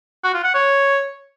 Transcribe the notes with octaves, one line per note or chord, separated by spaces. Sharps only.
F#4
F4
F#5
C#5